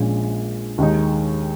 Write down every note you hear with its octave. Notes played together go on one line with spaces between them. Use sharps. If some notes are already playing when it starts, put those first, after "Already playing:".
Already playing: A#1 A#2 G#3 C#4
D#2 D#3 G#3 D#4